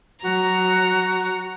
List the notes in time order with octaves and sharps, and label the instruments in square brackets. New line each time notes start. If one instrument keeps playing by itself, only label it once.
[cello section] F#3 [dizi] F#4 [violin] A#5